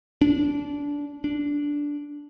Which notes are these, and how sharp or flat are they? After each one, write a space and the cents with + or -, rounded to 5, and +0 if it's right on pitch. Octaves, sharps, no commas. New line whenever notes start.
D4 -20
D4 -10